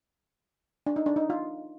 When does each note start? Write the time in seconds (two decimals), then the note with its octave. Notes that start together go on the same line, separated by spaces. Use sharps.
0.86 D4
0.96 D#4
1.06 D4
1.16 D#4
1.30 F4